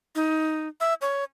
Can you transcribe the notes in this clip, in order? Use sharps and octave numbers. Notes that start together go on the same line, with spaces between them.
D#4
E5
C#5